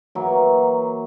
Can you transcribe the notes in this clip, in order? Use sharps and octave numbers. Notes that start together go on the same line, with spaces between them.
E3 F#3 A#3